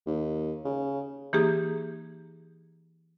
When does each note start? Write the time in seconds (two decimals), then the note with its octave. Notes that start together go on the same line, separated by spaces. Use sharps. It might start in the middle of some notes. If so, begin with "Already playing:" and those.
0.07 D#2
0.65 C#3
1.33 E3 A#3 D#4 G4 G#4